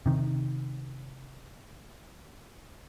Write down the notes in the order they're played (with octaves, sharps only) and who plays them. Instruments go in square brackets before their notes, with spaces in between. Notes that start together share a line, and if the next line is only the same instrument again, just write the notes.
[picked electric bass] C3 D#3